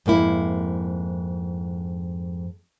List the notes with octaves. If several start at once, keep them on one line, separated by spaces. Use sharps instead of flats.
F2 G#2 A#3 E4